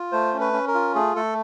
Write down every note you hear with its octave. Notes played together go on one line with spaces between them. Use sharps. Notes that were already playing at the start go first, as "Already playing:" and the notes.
Already playing: F4
A3 C5
C#4
B4
C#4
A#4
F4
A3 G#4
A3 A4